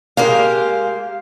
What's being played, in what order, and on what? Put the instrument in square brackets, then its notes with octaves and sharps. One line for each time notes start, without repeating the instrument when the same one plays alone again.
[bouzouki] G#3 A#3 G4 [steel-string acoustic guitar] F5